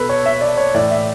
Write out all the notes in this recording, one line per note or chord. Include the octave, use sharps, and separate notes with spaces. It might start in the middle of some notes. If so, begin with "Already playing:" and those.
Already playing: B2 A4 B4
C#5
E5
D5
C#5
A2 E3 D5
E5